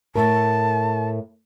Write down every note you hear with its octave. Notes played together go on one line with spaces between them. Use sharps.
A2 A3 A#4 A5